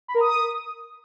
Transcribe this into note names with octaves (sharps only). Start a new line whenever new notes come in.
B5
A#4
D#6